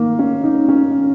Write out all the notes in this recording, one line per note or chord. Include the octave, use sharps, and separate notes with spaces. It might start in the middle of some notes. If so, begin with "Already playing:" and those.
Already playing: D#3 A#3
C#4
D#4
C#4